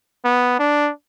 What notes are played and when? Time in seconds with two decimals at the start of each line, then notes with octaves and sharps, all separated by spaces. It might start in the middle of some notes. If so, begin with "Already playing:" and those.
0.24 B3
0.59 D4